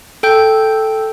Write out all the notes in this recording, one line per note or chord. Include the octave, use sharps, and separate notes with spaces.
A4 G5 G6